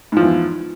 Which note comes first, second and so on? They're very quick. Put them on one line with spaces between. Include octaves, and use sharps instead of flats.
G#2 F3 E2